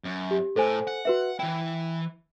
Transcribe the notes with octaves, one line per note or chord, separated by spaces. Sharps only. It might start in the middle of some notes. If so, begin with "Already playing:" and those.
F#2
G4
A2 A4 C5 G#5
F#5
F#4 B4 E5
E3 E4 G5